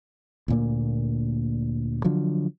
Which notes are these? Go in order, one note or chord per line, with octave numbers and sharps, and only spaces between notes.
D2 A#2 A#3
D3 F3 F#3